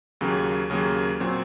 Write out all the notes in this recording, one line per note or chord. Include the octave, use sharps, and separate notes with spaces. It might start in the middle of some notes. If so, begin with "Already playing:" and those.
D#2 C#3 F#3 A#3
D#2 C#3 F#3 A#3
A#2 F#3 C4